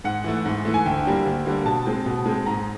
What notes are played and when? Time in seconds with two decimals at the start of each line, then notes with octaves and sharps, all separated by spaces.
0.04 G#2 F#5
0.24 E3 A3
0.45 G#2
0.65 E3 A3
0.74 G#5
0.85 D2 G5
1.05 D3 G3 A#3
1.26 D2
1.45 D3 G3 A#3
1.65 B2 A5
1.86 G#3 C4
2.06 B2
2.26 G#3 C4
2.46 G#2 A#5